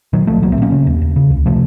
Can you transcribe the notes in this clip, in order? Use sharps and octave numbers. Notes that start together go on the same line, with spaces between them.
A#2 D#3 F#3
C2 F3 A3
C2 F#3 A#3
A3 C4
A#2 A#3 C#4
C#3
D#2
D#2
C#3
C#2
C3 F3 A3